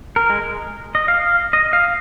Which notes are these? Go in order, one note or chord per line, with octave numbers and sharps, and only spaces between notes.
A#4
G#3
G#3
D#5
F5
F5
D#5
F5